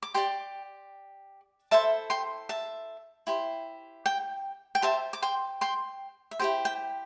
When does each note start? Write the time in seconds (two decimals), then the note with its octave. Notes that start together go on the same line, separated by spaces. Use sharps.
0.03 D6
0.14 G4 D5 G5 C6
1.71 E4 A4 C5 E5 A5
2.10 G5 C6
2.49 E5 A5
3.27 E4 G4 C5
4.06 G5
4.75 G5
4.82 G4 C5 E5 A5
5.13 D6
5.22 G5 C6
5.61 G5 C6
6.31 E5
6.39 E4 G4 C5 G5
6.65 G5